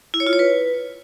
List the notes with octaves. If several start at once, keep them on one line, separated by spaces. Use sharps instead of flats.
E4
C#5
F4
C#5
B4